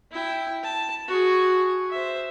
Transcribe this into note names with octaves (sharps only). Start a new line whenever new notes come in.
E4 G5
A5
F#4 G#4
C5 E5